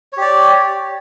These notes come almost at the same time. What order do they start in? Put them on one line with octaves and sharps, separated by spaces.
C#5 G4 D5